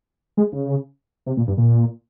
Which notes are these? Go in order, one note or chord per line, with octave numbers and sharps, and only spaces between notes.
G#3
C#3
C3
A#2
G2
A#2